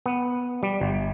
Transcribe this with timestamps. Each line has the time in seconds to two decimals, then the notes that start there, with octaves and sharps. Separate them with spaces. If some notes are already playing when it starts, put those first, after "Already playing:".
0.06 B3
0.63 G3
0.81 G1